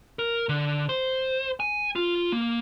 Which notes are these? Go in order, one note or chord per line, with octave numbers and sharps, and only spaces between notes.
A#4
D3
C5
G#5
F4
A#3